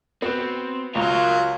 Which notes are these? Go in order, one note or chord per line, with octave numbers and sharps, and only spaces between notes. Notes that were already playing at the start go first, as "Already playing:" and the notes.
B3 C4 F#4
C#2 F#3 F4 A#4 C#5 A#5